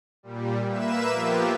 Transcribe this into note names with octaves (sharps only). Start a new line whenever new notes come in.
A#2 G3
A#3 B4 E5 E7
F3 A#3 B3 F4 G4